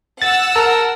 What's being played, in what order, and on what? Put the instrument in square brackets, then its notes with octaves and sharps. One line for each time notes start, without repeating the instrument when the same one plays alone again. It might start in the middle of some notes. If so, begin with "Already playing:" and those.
[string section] F#5 E6 [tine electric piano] A6
[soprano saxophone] A#4 [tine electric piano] A5